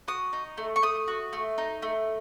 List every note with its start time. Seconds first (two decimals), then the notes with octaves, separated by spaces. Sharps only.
0.08 F#4 D#6
0.33 D#4
0.57 A3
0.76 C#6
0.82 A3 D#6
1.08 F#4
1.33 A3
1.58 D#4
1.82 A3